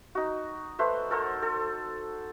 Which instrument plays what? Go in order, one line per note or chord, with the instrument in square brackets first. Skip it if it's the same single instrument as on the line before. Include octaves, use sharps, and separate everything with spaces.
[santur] D#4 F#4
A3 B4 C5
A4 A#4 C5 F#5
A4